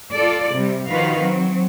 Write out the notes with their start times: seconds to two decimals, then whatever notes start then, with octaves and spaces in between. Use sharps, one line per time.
0.13 F4 A4 D5
0.53 C3 G3
0.87 D#3 F3 F4 F#4 B4 F5
1.20 F#3 C4